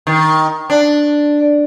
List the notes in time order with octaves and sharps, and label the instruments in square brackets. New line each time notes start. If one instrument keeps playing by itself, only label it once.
[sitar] D#3
D4